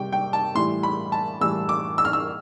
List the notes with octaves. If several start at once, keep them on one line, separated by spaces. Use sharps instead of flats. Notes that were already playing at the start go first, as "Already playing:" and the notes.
Already playing: C3 G3 G5
G5
A5
A2 E3 G3 C6
B5
A5
A2 E3 G3 E6
D6
E6
F6
E6